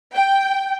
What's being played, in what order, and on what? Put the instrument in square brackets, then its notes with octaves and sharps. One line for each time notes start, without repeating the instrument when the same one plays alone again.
[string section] G5